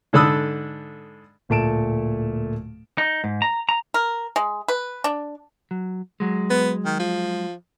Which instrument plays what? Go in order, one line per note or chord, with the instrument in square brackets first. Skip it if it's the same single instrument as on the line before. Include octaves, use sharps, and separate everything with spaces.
[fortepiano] G#2 D3 A4 B5 D#6 E6
[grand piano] D1 A#2 A3 A5 D7 E7
[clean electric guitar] D#4
G#2
A#5
A#5
[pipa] A#4
G#3
B4
D4
[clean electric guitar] F#3
F#3 G#3
[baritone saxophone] B3
D#3
F3